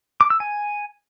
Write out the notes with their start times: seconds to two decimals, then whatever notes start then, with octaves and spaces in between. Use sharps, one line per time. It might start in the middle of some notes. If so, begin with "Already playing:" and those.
0.21 D6
0.30 E6
0.40 G#5